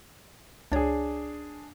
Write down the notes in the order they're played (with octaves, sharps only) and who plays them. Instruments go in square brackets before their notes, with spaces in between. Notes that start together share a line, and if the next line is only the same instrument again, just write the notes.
[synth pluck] C#2 C#5 [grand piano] D4 G#4